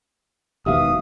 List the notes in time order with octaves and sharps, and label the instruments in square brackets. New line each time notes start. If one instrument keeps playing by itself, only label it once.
[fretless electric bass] E1 D#2 B2 [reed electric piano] G4 E5 F5 [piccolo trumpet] D#6